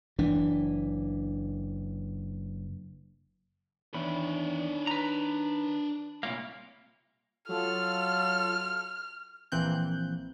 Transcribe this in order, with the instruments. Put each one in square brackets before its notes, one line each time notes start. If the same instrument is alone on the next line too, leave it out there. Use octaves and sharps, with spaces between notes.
[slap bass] F#1 E3 D4
[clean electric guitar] E2 [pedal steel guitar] D#3 B5 [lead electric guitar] D4 C#5
[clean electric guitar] B4 A#5
[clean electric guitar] C2 A#2 A#3 [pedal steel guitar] E4 C#5 F5
[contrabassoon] F#3 [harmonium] F4 A4 [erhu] F6
[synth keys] A#1 E3 A#3 C4 F#6 G6